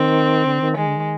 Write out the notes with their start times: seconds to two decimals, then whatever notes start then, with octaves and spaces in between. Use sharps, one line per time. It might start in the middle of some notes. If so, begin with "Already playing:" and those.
Already playing: D#3 C4
0.46 D3
0.61 D#3
0.77 D#3 G#3
0.86 D3
0.96 D#3